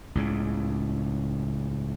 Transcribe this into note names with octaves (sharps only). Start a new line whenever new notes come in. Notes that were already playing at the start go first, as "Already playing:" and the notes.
C#2 A2 C#3